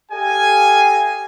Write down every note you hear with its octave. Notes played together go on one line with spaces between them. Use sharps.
G4 A4 D#5 F5 G#5